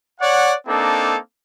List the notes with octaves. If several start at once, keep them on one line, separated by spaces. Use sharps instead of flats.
C#5 D5 F#5
A#3 C4 D4 D#4 A4